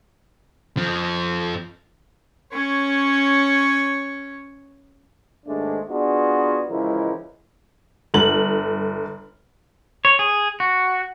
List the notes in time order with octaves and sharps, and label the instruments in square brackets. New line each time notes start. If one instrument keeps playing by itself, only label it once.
[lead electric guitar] F2 F3
[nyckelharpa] C#4 C#5
[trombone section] D#2 G#2 G#3 A3 D4
B3 D4 F4 F#4 G#4
C#2 E3 F3 G#3 E4 A#4
[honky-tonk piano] G1 F#7
[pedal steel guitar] C#5
G#4
F#4